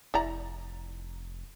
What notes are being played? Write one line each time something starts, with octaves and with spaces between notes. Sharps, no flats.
F1 E4 D5 A#5